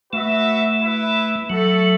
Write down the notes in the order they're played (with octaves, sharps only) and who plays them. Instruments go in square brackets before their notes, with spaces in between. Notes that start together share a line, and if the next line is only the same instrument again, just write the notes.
[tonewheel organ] A3 [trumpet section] F#4 B4 E5
[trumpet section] E4 B4 E5
[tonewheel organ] F#3 [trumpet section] A3 F#4 A4 E5